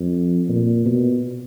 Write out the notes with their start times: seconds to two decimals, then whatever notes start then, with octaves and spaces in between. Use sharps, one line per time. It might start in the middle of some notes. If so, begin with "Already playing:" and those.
Already playing: F2
0.49 A#2
0.86 B2